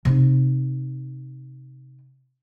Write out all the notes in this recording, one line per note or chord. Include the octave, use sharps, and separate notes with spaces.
C3 D#4